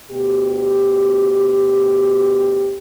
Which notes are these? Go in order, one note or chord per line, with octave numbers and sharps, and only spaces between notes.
D2 B2 G4